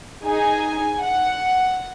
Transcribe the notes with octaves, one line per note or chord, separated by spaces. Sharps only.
D#4 G#4 G#5
F#5